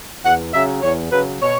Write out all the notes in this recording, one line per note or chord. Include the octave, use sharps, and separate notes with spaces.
E2 F#5
C#3 F#3 E5
E2 C#5
C#3 F#3 B4
B2 C#5